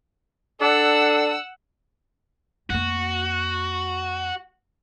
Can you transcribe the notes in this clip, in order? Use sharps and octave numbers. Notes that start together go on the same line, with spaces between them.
D4 A4 F#5 E6
F2 A#3 F#4